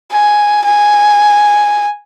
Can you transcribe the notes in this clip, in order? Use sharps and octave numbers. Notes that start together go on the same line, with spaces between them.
G#5
G#5